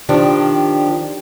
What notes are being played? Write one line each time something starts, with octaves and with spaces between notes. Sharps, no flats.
D#3 F3 D4 G4